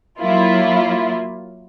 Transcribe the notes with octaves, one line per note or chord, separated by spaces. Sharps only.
F#3 A#3 E4 F4